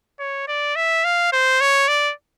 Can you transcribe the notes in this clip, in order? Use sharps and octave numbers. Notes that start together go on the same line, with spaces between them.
C#5
D5
E5
F5
C5
C#5
D5